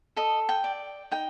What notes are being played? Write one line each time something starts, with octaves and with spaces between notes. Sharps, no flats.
A4 D#5
G5
D5
D#4 G5